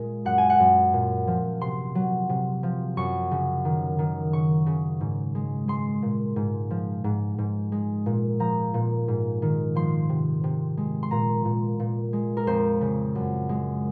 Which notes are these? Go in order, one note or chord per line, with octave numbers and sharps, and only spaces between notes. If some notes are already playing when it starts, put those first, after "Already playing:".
Already playing: A#2 G#3
F#2 F#5
G#5
F#5
F#2
A#2
F3
C3 C6
F#3
C3
F3
F#2 C#6
C#3
D#3
D#3
C#3 C#6
C#3
G#2
G#3
G#3 C6
A#2
G#2
F3
G#2
G#2
G#3
A#2
F3 A#5
A#2
G#2
D#3
F3 C6
C3
C3
G#3
C6
A#2 A#5
A#2
A#2
G#3
A#4
F2 C5
C#3
F#2
G#3